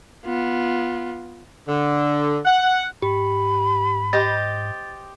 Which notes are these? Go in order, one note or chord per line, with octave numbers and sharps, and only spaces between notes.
B3 F4
D3
F#5
G#2 G4 B5
G4 C5 D#5 A6